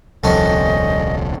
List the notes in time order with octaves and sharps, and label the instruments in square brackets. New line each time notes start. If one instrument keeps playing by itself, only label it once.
[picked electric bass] D#1 C2 [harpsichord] F2 C#4 D4 [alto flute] D#5